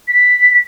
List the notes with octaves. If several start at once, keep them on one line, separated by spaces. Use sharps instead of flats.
B6